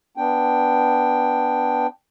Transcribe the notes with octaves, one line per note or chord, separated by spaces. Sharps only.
B3 D4 G5